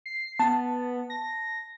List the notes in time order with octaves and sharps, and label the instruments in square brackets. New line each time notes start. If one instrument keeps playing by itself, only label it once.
[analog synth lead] C7
[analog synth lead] B3 [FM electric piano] A5
[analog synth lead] A#6